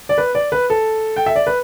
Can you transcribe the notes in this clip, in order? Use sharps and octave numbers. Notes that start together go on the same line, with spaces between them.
D5
B4
D5
B4
A4
G5
E5
D5
B4